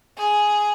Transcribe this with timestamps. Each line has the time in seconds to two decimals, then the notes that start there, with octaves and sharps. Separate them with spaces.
0.17 G#4